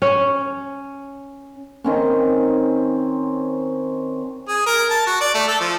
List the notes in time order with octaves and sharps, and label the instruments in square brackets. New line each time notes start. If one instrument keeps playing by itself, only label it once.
[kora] C#4
[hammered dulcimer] D#3 C4 C#4
[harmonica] G#4
A#4
A5
F#4
D5
A3
A4
F3